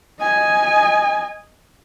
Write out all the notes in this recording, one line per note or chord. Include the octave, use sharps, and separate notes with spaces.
D#5 G#5